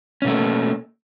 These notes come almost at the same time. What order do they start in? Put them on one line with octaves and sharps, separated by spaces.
C#4 B2 A3 A#3